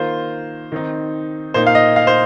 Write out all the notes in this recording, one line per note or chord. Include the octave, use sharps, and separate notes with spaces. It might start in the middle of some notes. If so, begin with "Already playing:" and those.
Already playing: D#3 A#3 F4 C5
D#3 C4 D#4
A#2 A#3 D#4 C5
F5
D#5
F5
C5